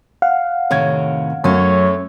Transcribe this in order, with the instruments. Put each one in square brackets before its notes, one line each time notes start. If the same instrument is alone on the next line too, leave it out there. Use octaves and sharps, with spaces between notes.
[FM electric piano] F5 F#5
[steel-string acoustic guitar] A2 C3 D#3 [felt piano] C#5 G#6
[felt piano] F#2 [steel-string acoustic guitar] A3 C#4 [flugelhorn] C#5